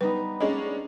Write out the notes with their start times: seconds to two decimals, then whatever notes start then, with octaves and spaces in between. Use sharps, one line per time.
0.01 G3 B3 D#4 B4
0.41 G#3 C#4 D4 D#5